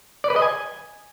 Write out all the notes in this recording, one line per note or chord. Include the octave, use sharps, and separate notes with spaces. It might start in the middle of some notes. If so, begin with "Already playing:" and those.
D5
B4
D#5
G#5